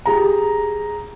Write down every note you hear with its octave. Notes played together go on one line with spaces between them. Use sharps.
G4 G#4 A#5